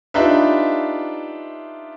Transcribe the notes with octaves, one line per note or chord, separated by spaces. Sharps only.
D4 D#4 F4 G4 B4 E5